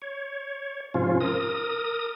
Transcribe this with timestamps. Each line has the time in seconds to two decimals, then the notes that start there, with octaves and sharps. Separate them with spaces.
0.02 C#5
0.94 G#2 C3 F3 C#4 F4
1.21 A#4 D#6